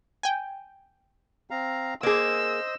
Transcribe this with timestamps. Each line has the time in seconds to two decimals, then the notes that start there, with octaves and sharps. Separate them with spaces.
0.23 G5 G#5
1.51 C4 F5 A#5
2.03 A#3 G#4 C5 D#5 E6